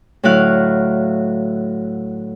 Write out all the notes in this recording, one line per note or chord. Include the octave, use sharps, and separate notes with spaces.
A2 D3 F#3 E4 F5 F#6